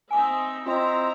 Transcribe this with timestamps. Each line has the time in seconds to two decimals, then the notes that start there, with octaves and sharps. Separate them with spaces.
0.11 C4 D#4 E5 G#5 D6
0.66 C4 E4 F4 D#5 A#5